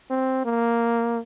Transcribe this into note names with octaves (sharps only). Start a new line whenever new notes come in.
C4
A#3